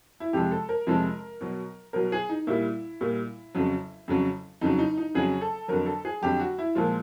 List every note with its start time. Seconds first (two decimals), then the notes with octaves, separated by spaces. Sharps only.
0.20 E4
0.33 F2 C3 F3 G#3 G4
0.51 A4
0.69 A#4
0.87 F2 C3 F3 G#3
1.41 B2 F#3
1.93 B2 F#3 A#4
2.12 G#4
2.29 D#4
2.47 A#2 G3 E4
3.01 A#2 G3
3.55 F2 C#3 F#3
4.08 F2 C#3 F#3
4.61 F2 C#3 F#3 D#4
4.79 D#4
4.98 D#4
5.14 F2 C#3 F#3 G#4
5.41 A4
5.68 F2 D3 F#3 A#4
5.86 A4
6.05 G#4
6.22 F2 D3 F#3 G4
6.39 F#4
6.58 E4
6.75 A#2 F3 G#3 F4